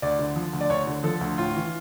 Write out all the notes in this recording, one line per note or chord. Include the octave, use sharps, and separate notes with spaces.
D2 D5
D3
F3
D2
D5
D2 C#5
D3
F3 A4
D2
A2 F4
E3